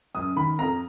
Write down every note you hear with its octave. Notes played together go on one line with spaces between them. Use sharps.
F#2 D#6
D#3 B5
F2 A#5